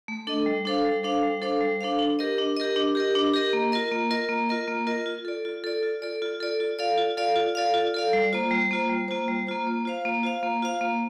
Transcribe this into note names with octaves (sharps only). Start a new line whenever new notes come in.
A3
D4 A4 D#5
G3
D4 A4 C5 F5
G3
D4 A4 C5 F5
G3
D4 A4 C5 F5
G3
D4 A4 C5 F5
D4
G4 A#4 D#5
D4
G4 A#4 D#5
D4
G4 A#4 D#5
D4
G4 A#4 D#5
A#3
F4 A#4 D#5
A#3
F4 A#4 D#5
A#3
F4 A#4 D#5
A#3
F4 A#4 D#5
F4
A4 D5
F4
A4 D5
F4
A4 D5
F4
A4 D5
F4
A4 D5 F5
F4
A4 D5 F5
F4
A4 D5 F5
F4
A4 D5 F5
G3
A#3 F4 C5
G3
A#3 F4 C5
G3
A#3 F4 C5
G3
A#3 F4 C5
A#3
F4 C5 F5
A#3
F4 C5 F5
A#3
F4 C5 F5
A#3